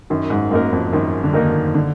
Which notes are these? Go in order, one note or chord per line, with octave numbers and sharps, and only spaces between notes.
F#2 D#3
G#2
F#2 A#3 D#4 A#4
F2
F#2 D#3
D3
D#3 A#3 D#4 A#4
D3